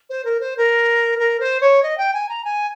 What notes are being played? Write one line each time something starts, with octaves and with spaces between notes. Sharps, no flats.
C5
A#4
C5
A#4
A#4
C5
C#5
D#5
G5
G#5
A#5
G#5